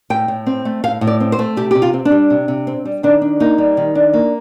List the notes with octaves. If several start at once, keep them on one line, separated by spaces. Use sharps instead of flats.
A2 G5
A2
C4
A3
A2 F5
A2
D5
C4
C5
A3
C3 G4
C3 G4
F4
C4
D4
G3
C3
C3
C4
G3
D#3 D4
D4
A#3 D#4
G3
D#3
D4
A#3